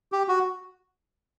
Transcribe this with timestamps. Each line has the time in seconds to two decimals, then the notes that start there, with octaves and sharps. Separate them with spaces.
0.12 G4
0.28 F#4